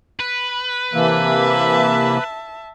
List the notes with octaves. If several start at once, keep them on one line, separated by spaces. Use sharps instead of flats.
B4
C3 E3 A#3 E5 A5